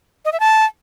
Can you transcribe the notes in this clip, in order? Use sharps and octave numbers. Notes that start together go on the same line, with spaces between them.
D#5
E5
A5